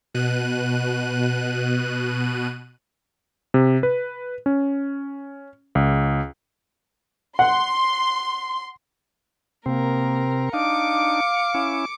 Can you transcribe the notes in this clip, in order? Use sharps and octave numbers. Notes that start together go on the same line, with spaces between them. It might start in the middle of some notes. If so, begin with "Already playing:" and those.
B2 F#6 D#7
C3
B4
C#4
C#2
F#5 C6
C3 A#3 C4 A#4
D4 D#4 F5 D6 C#7
C#4 E4